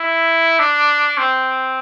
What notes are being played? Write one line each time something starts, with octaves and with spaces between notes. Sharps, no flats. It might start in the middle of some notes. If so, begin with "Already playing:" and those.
Already playing: E4
D4
C4